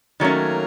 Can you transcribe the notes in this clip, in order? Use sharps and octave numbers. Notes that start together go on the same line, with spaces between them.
D#3 F#3 A3 A#3 C#4